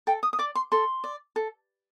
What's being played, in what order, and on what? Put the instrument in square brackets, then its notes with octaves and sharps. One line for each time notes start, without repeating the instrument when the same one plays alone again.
[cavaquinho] A4 G5
D#6
D#6
D5 D6
C6
A4 C6
D5
A4